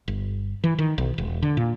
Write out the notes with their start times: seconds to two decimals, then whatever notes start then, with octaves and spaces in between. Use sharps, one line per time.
0.08 G1
0.64 E3
0.78 D#3
0.98 B1
1.18 E1
1.42 D3
1.57 A#2